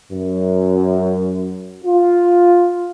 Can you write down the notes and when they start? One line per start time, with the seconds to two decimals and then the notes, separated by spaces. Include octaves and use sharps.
0.13 F#2
1.85 F4